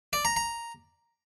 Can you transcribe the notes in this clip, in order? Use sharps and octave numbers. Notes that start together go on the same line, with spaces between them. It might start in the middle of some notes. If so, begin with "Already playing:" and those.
D5
A#5
A#5